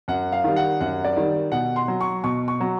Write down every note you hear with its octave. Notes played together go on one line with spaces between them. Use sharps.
F#2 F#5
F5
D#3 G3
F#5
F#2 F#5
D5
D#3 G3
B2 F#5
C6
F#3
C#6
B2 C#6
C#6
F#3